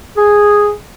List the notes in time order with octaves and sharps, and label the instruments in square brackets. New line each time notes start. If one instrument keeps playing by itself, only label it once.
[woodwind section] G#4